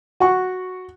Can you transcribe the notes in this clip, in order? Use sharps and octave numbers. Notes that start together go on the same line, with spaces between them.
F#4 F#5 C#6